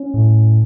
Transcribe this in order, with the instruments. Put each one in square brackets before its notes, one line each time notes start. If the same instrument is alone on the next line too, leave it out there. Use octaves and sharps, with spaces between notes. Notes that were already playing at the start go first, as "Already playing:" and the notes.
Already playing: [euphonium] C#4
[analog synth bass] A2